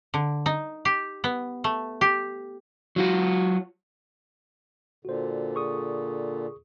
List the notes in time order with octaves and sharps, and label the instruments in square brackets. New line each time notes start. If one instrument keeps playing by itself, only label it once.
[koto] D3
D#4
G4
B3
A3
G4
[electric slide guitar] F#3 F4 F#4
[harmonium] A#2 D3 [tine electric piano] F#4 C5
[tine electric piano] G#4 C#6 D#6